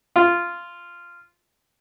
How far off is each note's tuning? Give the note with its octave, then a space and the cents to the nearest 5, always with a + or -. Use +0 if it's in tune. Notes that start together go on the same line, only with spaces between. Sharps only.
F4 -10